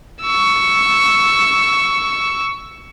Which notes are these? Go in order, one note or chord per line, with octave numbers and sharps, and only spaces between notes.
C#6 E6